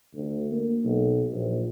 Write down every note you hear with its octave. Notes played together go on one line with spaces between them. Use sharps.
D2
A#3
B1
A#1